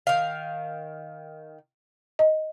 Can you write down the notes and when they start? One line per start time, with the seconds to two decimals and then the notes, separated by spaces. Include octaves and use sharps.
0.07 D#3 F5
2.19 D#5